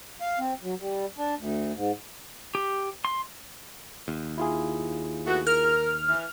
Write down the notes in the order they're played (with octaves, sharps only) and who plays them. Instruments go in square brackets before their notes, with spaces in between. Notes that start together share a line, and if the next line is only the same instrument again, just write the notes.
[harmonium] F5
C4
F#3
G3
D4
D2
G#2
[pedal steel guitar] G4
C6
[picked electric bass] D#2
[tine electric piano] E4 F4 G#4
[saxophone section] A3 B3 F#4
[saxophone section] A#4 [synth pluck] F6
[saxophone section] E3